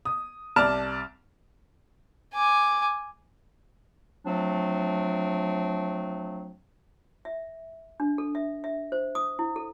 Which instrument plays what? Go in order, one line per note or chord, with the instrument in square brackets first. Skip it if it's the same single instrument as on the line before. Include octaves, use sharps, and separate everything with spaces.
[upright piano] D#6
C2 D5 A5 F6 E7
[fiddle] G#5 D6
[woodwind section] F3 F#3 A3 C4 D4
[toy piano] E5
D4
A4
E5
E5
C5
D#6
E4
A4